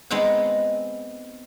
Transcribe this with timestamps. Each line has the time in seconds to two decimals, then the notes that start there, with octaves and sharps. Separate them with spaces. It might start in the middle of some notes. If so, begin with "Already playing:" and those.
0.11 G#3 B3 C4 D#4 F#5